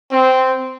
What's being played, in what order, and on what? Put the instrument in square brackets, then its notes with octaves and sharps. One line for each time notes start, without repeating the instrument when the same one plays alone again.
[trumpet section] C4